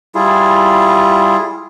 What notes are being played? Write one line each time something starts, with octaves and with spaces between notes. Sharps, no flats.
G3 E4 F4 G#4